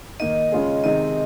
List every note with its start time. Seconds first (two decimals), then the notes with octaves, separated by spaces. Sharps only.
0.20 D#3 A#3 D#4 D#5
0.52 C#3 G#3 C#4 F4 G#4
0.84 C3 D#3 G#3 C4 D#4 D#5